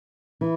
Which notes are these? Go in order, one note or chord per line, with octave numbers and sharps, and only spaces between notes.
E3